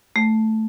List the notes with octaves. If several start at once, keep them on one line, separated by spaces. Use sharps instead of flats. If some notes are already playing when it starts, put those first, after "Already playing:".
A3